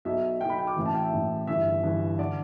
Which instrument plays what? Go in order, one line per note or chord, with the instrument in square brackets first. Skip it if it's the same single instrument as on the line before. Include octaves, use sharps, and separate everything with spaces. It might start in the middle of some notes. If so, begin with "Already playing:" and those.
[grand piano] B1 B2 E5
B1 B2 G5
B5
G5
D6
A1 A2 E3
A5
G5
E5
A1 A2 E3
G1 G2 E3 E5
G1 G2 E3
D3 D5